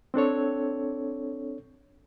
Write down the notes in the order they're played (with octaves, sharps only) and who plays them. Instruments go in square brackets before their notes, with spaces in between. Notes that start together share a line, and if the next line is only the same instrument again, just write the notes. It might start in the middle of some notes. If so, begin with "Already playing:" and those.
[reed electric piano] C4 D4 A4 C#5